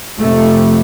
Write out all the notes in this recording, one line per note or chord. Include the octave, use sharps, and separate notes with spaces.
F2 C3 A3